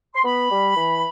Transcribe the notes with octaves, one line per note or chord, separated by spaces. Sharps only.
C6
B3 B5
G3
E3